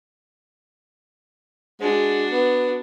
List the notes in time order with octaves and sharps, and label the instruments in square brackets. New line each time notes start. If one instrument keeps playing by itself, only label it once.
[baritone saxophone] G#3 [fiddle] D4 F#4
[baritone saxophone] B3